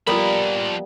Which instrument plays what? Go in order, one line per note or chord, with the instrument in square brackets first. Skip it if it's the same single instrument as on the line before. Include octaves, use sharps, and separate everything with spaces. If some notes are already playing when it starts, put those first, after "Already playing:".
[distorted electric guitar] F3 B5 [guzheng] G3 A#3 B3 [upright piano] F4 A#4